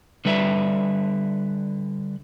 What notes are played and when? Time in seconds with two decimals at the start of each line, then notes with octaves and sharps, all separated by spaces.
0.25 D3 G3 B4 E5